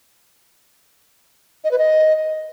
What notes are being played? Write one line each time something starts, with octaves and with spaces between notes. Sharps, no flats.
D#5
B4
D#5